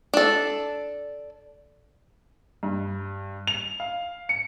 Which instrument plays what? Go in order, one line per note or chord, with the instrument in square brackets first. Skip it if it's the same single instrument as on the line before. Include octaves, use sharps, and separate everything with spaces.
[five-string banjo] D4 A4
[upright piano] G2
F7
F5
C#7